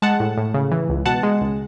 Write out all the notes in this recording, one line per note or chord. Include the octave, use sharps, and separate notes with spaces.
G#3 F#5 A5
A2
A2
C#3
E3
C#2
B2 F#5 A5
G#3
C#2